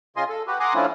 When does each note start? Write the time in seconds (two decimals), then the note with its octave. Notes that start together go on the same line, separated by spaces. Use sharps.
0.16 C#3 F4 D#5 G#5 C6
0.29 A4
0.47 F#4 G4 B4
0.60 F#5 G#5 A#5 C6 D6 D#6
0.74 F3 A3 C#4 D4 E4 F4